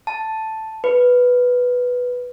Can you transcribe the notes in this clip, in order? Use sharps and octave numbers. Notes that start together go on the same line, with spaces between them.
A5
B4